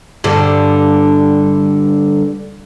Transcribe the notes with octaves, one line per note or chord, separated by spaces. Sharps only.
G2 D3